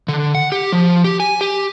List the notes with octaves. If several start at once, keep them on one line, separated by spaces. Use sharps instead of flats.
D3
F#5
G4
F3
G4
G#5
G4